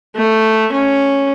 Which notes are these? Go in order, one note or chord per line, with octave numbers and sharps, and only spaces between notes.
A3
C#4